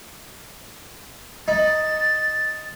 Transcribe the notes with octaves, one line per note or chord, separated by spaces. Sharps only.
D#4 A6